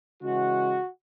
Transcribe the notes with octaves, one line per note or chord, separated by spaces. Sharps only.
C#3 E3 G#3 F#4